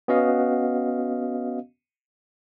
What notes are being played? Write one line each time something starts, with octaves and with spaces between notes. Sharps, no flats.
B3 C#4 F#4 D#5 F5